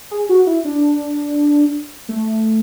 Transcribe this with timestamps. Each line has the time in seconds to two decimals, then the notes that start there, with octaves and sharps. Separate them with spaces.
0.11 G#4
0.29 F#4
0.47 E4
0.65 D4
2.09 A3